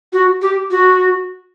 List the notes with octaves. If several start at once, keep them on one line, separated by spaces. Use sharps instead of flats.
F#4
G4
F#4